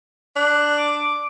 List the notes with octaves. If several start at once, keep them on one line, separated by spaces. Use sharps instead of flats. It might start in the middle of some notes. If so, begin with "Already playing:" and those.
D4 F#6
D6